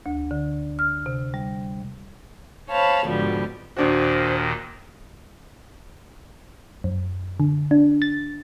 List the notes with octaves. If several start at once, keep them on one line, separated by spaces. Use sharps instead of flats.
D2
D3
F6
C3
G3
C5 C#5 F5 A5 B5
G#2 B2 D3 F3 G3
D#2 A#2 D#3 D4 F#4 C5
F#2
D3
D4
A6